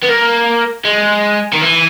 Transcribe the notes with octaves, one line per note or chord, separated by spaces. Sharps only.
B3
A#3
G#3
D#3
E3